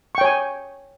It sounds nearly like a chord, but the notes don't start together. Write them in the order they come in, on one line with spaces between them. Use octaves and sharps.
C#6 G5 C#5 G#5